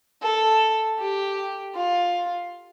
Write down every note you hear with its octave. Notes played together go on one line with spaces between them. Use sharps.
A4
G4
F4